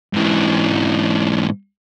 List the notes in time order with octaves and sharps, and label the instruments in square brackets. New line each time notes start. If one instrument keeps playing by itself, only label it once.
[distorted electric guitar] G#2 E3